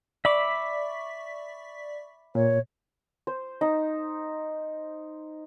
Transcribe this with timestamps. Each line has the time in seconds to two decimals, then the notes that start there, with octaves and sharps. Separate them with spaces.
0.25 D5 E5 B5 C#6 D6 B6
2.35 A#2 C#5
3.27 C5
3.61 D#4